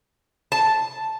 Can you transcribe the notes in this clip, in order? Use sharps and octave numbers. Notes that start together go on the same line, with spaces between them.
A5